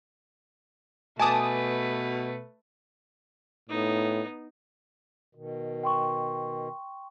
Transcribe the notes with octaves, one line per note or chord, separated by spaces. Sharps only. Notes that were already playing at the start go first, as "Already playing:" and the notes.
B2 A3 B4 G#5 A5 D6 D#6
A2 B3 D#4
B2 D#3
G5 C6 C#6